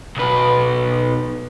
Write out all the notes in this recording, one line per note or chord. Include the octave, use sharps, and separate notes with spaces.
B1 B4